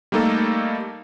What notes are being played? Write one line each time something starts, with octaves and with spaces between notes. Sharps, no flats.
G3 A3 A#3 D#4 A4